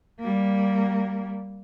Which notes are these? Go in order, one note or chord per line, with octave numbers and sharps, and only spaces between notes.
G3 A#3